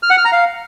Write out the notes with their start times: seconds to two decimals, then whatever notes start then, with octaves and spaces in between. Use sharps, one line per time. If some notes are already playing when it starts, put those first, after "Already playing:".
0.03 F6
0.10 F#5
0.18 F6
0.25 A#5
0.32 F5